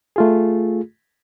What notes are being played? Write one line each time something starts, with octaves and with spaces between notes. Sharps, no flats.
A3 F4 G#4